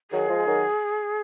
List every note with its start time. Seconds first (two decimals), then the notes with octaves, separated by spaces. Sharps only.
0.11 D#3 F#3 G#4
0.29 F3 G#3
0.47 D#3 F#3